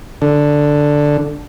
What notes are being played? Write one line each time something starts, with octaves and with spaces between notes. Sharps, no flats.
D3